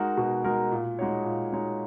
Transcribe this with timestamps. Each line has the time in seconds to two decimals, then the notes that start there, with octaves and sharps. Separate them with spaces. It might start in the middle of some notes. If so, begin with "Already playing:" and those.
Already playing: G#3 D#4 F#4 A#4
0.17 B2
0.44 G#3 D#4 F#4 A#4
0.72 A#2
0.99 G#3 D#4 F#4 C#5
1.25 A#2
1.52 G#3 D#4 F#4 C#5